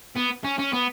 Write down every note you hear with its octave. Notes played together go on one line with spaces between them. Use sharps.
B3
C#4
C#4
B3